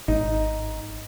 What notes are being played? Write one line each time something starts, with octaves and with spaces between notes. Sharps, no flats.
G#1 D#4